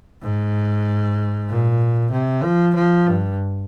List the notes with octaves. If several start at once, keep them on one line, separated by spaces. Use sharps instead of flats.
G#2
A#2
C3
F3
F3
G2